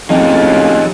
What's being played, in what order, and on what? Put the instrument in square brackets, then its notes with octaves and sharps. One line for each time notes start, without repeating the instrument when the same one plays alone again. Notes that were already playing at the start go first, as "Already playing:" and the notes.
[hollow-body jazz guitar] F2 [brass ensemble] A2 C#3 F4 [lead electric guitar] D#4 G4